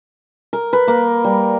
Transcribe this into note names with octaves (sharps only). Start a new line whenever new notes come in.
A#4
B4
A#3
G3